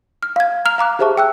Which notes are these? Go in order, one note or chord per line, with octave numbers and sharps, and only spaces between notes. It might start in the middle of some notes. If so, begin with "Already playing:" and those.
F6
F5 G#6
A#5 F6 F7
F5 A#5 D6 F#6
G4 G#4 C5 E5 A5 C#6
G5 E6 F#6